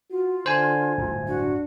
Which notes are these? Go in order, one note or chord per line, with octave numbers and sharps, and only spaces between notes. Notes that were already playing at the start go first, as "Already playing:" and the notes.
F4 F#4
D3 C5 G#5
D1 G1 E2
D4 F#4